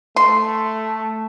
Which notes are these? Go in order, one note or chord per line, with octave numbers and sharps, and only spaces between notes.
A3 C6